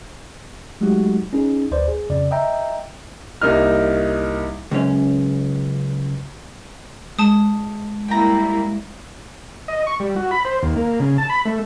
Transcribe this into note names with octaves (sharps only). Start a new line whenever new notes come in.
F#3 G#3 A3 D#4 F#4 G4
C#4 D#4 G#4
A1 D2 B4 C5 D5
G#4
F2 C#3 D5
D#5 E5 G5 A#5
C2 A#3 D#4 F6
C#2 F#2 C#4
G#3 A5 D#6
G3 A#3 E4 G5 A#5
D#5
C#6
G3
F#4
B5
C5
D#2
A#3
C#3
A5
B5
A3